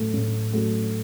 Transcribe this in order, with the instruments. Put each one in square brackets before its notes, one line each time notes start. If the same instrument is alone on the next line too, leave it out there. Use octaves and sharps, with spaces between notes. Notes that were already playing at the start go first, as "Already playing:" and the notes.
Already playing: [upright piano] A2 F#3 A3
A2
F#3 A3